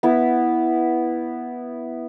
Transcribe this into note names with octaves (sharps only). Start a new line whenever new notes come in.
B3 E4